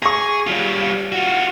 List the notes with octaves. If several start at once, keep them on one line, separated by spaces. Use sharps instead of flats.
G#4 C#6 A#6
G3 F4
F4 F#4